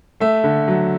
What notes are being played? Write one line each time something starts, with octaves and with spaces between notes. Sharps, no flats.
A3 E5
D3
F#3